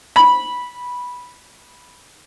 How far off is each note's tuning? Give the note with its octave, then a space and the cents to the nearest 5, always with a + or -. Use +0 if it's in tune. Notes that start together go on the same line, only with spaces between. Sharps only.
B5 -10